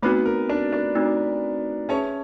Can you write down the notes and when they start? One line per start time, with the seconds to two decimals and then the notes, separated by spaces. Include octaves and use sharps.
0.03 A3 B3 C4 D#4 F#4 B4
0.26 A#4
0.49 D4 D5
0.73 D4 D5
0.96 A3 C4 D#4 F#4
1.89 C#4 G#4 B4 C#5 E5 A5